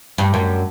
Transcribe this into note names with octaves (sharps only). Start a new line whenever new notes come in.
G2
F#2